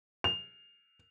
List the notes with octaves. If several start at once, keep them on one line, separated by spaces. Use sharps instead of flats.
F7